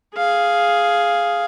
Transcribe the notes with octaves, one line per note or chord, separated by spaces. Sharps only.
G#4 F5